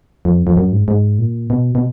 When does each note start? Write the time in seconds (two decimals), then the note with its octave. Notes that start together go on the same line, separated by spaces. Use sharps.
0.25 F2
0.47 F2
0.56 F#2
0.72 G#2
0.88 G#2
1.19 A#2
1.50 B2
1.75 B2